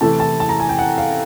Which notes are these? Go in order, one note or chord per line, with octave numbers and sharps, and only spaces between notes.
C3 E3 A3 C4 E4 A5
A5
A5
A#5
G#5
G5
F#5
F5